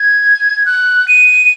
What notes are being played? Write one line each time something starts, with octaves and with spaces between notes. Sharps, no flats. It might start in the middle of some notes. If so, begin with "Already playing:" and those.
Already playing: G#6
F#6
D#7